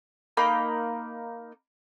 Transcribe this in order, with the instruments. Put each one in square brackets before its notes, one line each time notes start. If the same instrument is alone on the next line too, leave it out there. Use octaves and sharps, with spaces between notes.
[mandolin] A#3 D#4 B5